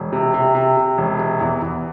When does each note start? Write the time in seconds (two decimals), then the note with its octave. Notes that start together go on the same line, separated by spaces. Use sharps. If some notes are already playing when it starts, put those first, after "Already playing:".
Already playing: E1
0.13 C3
0.34 C3
0.55 C3
0.77 C3
0.98 E1
1.19 C3
1.40 E2
1.62 E2